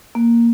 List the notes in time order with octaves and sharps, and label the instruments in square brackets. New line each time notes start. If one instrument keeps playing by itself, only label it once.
[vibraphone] A#3